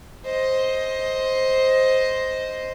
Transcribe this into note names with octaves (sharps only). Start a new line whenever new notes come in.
C5 D#5